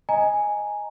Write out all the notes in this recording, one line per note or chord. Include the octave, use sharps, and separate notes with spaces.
D#5 G#5 A#5